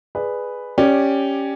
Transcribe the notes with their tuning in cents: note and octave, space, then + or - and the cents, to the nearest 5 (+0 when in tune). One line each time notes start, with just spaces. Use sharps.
G#4 +0 B4 +0 D5 +20
C#4 +0 G4 +0 D5 +10